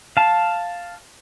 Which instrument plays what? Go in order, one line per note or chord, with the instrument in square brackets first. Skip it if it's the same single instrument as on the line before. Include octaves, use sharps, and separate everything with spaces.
[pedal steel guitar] F5 A5